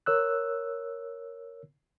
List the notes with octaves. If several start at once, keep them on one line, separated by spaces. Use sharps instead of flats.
A#4 C#5 E6 F#6